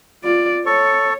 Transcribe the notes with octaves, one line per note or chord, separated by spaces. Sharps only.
F4 D5
A4 C#5 C#6